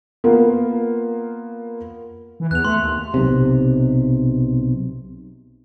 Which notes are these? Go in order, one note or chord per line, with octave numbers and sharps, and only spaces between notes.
A#3 B3 F4
E3
E2 F#6 F7
A3 C6
D#2
B1 C3